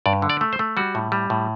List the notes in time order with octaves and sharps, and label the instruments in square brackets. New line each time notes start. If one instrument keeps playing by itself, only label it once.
[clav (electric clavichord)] G2 D5
D3
D5
A3
C5
A3
G3 F#4
A2
G3
A2